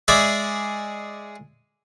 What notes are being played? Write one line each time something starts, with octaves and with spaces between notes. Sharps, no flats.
G#3 G#4 D5 E5